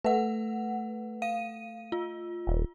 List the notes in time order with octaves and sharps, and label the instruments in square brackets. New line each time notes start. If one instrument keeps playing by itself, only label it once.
[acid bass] A3 [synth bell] B4 F#5
[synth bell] F5 D#7
F4
[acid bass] D#1